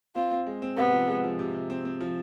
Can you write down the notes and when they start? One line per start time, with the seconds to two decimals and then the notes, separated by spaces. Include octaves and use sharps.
0.16 C4 F4
0.31 C4
0.47 G#3
0.62 C4
0.77 C3 B3
0.93 F3
1.08 G#3
1.24 F3
1.39 C3
1.54 C3
1.70 C4
1.85 C4
2.01 F3